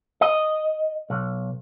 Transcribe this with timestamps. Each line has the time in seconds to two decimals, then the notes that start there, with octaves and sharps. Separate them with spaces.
0.21 D#5
1.10 B1